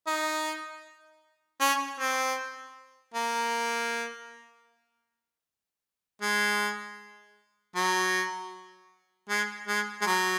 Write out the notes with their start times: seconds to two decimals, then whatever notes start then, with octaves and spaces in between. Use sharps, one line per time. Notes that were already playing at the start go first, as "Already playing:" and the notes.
0.07 D#4
1.60 C#4
1.99 C4
3.14 A#3
6.22 G#3
7.76 F#3
9.29 G#3
9.68 G#3
10.02 G#3
10.06 F#3